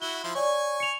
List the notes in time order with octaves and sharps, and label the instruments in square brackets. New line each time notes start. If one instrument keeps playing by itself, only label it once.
[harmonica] E4 F#4 F#5 [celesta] G7
[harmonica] F3 E4 C6
[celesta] C#5 D5 [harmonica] G#5 C#6
[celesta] C#7 F7